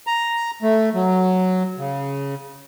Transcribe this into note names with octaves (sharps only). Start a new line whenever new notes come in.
A#5
A3
F#3
C#3